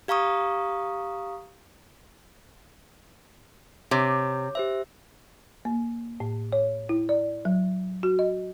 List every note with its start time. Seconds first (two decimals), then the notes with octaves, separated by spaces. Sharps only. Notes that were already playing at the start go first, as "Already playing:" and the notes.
0.08 G4 F5 A#5 C#6 D#6
3.91 C3 C#5
4.55 G4 C5 E5
5.65 A#3
6.20 A2
6.53 C#5
6.89 E4
7.09 D5
7.45 F#3
8.03 F#4
8.19 D#5